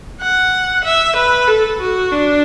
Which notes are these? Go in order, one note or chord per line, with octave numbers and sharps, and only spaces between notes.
F#5
E5
B4
A4
F#4
D4